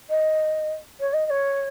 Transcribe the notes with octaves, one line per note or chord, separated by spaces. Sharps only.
D#5
C#5
D#5
D#5
C#5